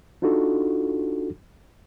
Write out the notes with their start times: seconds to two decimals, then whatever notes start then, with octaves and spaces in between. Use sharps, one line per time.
0.22 D4 D#4 F4 F#4 A4